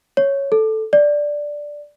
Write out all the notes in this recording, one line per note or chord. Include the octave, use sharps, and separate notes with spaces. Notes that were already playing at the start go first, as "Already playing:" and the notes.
C#5
A4
D5